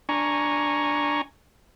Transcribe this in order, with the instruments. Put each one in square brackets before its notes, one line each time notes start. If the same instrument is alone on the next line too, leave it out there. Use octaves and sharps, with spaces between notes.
[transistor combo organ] D4 G#5 A#5 C#6